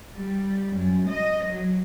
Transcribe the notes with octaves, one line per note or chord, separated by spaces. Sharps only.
G3
F#2
D#5
F#3